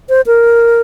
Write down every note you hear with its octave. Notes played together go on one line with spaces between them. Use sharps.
C5
A#4